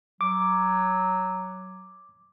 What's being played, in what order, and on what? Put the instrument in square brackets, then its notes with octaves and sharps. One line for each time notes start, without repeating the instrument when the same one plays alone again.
[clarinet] F#3 [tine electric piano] D6